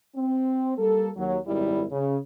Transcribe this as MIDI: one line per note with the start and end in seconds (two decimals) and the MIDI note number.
0.16 0.74 60
0.77 1.09 55
0.77 1.09 58
0.77 1.09 69
1.15 1.38 39
1.15 1.38 54
1.47 1.84 32
1.47 1.84 42
1.47 1.84 47
1.47 1.84 55
1.47 1.84 64
1.91 2.17 49